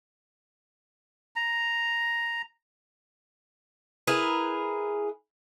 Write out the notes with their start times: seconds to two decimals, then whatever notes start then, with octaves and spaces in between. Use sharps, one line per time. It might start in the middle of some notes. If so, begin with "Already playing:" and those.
1.36 A#5
4.07 E4 G#4 A#4 B4